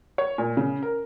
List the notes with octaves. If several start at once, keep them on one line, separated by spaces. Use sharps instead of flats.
C#5
A#2
C#3
A#4